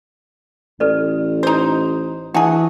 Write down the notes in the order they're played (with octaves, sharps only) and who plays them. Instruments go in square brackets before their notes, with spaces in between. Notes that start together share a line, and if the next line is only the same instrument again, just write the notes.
[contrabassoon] A1 [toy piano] A4 B4 D5
[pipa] D#4 C5
[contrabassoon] E3 [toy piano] D4 A5 [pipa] F#4 G#4